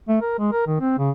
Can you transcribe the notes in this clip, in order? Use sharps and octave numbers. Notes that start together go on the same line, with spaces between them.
A3
A#4
G#3
A#4
D#3
C4
C#3